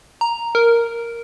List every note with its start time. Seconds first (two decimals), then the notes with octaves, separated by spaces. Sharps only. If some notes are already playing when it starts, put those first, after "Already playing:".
0.21 A#5
0.55 A#4